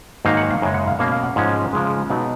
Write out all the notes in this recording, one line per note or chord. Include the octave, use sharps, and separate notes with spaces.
G#2 D#3 F#3 A#3 D#4 F5
F#5
F5
F#2 C#3 G#3
F#5
F5
B2 A#3 C#4 F5
F5
F#5
G#2 F3 G#3 C#4
C#3 F3 G#3
B2 F#3 B3 D#4 F#5